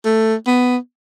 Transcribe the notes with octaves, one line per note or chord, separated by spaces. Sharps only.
A3
B3